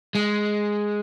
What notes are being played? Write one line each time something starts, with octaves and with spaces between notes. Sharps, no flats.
G#3